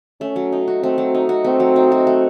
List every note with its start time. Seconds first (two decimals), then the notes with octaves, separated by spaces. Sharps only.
0.21 A3 C#4
0.36 F#3
0.52 D#4
0.68 F#4
0.83 A3 C4
0.98 F#3
1.14 D#4
1.29 F#4
1.44 A3 C4
1.60 F#3
1.76 D#4
1.92 F#4
2.07 A3